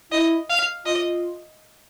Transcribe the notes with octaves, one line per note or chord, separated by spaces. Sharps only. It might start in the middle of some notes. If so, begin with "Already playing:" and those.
E4 D#5
F5
F4 D#5